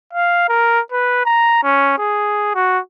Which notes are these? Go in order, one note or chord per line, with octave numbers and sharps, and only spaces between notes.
F5
A#4
B4
A#5
C#4
G#4
F#4